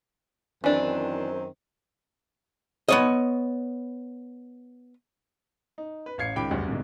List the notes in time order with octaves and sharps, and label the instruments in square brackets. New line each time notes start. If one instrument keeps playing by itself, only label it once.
[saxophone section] F#2 D#3 C4 [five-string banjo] E3 D4
[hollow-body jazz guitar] B3 C#5 D#5
[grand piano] D#4
B4
A1 F5 G#6 C7 C#7
C#2 D#3 G5 B5 D6 D7
F#1 D2 G2
C2 G#2 B2 D3